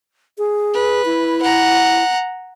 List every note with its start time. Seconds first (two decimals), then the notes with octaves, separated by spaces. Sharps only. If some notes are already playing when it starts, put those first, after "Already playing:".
0.38 G#4
0.74 B4
1.05 E4
1.42 F#5 A#5